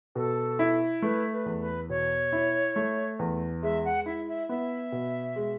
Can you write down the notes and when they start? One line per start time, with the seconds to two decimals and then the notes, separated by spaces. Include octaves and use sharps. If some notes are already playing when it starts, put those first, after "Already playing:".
0.15 B2 A4
0.59 E4
1.02 A3 B4
1.32 B4
1.46 E2
1.60 B4
1.89 B2 C#5
2.33 E4
2.76 A3
3.19 E2
3.63 G#3 E5
3.85 F#5
4.05 E4 E5
4.28 E5
4.49 B3 E5
4.92 B2
5.36 G#3